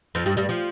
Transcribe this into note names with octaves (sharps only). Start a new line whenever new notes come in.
F2 F3
G2 G3
G2 G3
F3